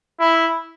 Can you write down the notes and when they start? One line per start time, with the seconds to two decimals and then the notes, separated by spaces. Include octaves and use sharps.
0.20 E4